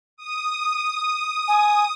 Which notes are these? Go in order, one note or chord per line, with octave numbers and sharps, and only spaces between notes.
D#6
G#5